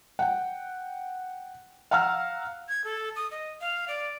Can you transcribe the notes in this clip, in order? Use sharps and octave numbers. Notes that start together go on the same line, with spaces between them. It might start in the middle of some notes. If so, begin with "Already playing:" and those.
F#5 G5
F5 F#5 A#5 E6 F6
G#6
A4
D#6
D#5
F5
D5